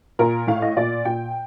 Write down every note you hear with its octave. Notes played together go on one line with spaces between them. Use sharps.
A#2 A#4
A2 F5
D#5
A#2 D5
A#2 G5